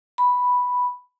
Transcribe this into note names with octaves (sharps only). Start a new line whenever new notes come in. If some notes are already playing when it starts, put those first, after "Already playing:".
B5